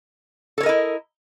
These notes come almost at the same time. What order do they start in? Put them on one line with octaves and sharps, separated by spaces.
A4 C#5 A#4 D#5 E4